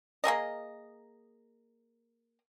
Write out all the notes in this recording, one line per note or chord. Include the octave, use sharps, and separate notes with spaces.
A#3 G#4 A#4 D#5